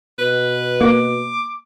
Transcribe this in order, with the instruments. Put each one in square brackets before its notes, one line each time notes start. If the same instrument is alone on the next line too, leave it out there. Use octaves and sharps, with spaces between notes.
[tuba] B2 [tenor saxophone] B4
[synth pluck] A#3 [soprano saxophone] D6